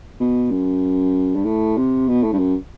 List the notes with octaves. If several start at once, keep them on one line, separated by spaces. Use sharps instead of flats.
B2
F#2
G2
A2
C3
B2
A2
G2
F#2